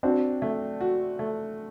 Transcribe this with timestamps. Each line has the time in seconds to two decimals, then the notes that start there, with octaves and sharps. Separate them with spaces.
0.03 C4 D4 F#4
0.42 A3
0.81 F#4
1.19 A3